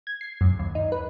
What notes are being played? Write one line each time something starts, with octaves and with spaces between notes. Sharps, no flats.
G#6
C7
F#2
D#2
D#4
B4